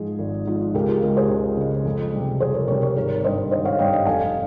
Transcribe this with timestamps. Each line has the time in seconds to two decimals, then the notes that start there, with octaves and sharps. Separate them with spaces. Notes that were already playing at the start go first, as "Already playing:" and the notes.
Already playing: G#2 F3 F4 G#4
0.19 G#1
0.47 G#2 F3
0.74 C#2 G4 A#4
0.88 F4 G#4
1.02 C#3 G#3 G4 A#4
1.17 G#4 C5
1.29 C#2
1.57 C#3 G#3
1.85 F2
2.14 C3 G3
2.40 F2 G#4 C5
2.54 A#4 C#5
2.68 C3 G3 A#4 C#5
2.82 A#4 C#5
2.96 G#1 A#4 C#5
3.24 G2 G3 C5 D#5
3.51 G#1 C5 D#5
3.65 C#5 F5
3.79 G2 G3 D#5 G5
3.93 D#5 G5
4.06 F1 F5 G#5